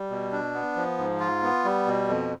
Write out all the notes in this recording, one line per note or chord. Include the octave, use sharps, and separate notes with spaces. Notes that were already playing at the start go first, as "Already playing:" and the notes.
Already playing: G3
B2
D4
B3
F3
G#2
F4
B3
G3
B2
F2